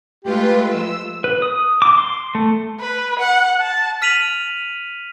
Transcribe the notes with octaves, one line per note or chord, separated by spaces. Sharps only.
G#3 A3 F4 G4 B4
F3 E6
B4
D#6
D6
C6
A3
B4
F#5
A5
F6 B6 D#7 F7 F#7